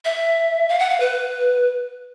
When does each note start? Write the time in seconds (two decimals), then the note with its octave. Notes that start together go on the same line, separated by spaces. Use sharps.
0.05 E5
0.69 F5
0.79 F#5
0.90 F5
1.00 B4